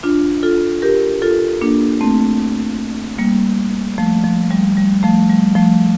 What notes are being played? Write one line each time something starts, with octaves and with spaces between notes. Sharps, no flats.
D4 F4
F4 A4
G4 A#4
F4 A4
A#3 D4
A3 C4
G3 A#3
F3 A3
F3
G3
G3
F3 A3
G3
F3 A3